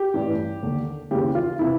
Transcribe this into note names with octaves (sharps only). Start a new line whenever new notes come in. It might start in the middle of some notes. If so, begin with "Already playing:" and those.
Already playing: G4
A1 G2 E3
D#2 D3
D#2 C#3 E3 G4
F4
C3 E3 E4